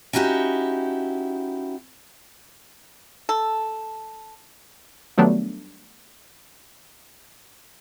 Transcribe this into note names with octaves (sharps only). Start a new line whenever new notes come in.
C#4 D#4 E4 F#4 G4
A4
D#3 F#3 G3 A3 B3 D4